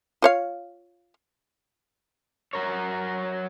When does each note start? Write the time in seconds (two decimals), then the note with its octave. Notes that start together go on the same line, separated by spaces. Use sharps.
0.22 F4 C#5 F5
2.53 F#3 A#4 C#5